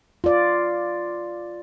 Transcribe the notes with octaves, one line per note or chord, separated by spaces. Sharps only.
F4 D5